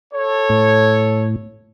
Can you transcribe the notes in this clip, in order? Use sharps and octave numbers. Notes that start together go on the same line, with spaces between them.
A4 C#5
A2